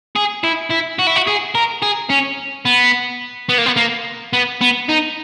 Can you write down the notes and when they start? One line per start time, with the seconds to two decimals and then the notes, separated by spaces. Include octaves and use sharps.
0.16 G#4
0.44 E4
0.71 E4
0.99 F#4
1.07 E4
1.16 F#4
1.27 G#4
1.55 A#4
1.83 G#4
2.10 C#4
2.65 B3
3.49 B3
3.58 A#3
3.66 B3
3.77 A#3
4.33 B3
4.61 B3
4.89 D#4